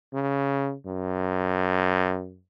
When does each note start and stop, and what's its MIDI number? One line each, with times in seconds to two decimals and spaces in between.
0.14 0.75 49
0.86 2.41 42